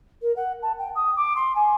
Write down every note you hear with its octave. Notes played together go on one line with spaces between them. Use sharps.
A#4
F#5
A5
G5
D#6
D6
C6
G#5